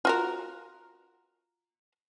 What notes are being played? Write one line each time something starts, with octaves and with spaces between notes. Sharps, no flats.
F4 F#4 A#4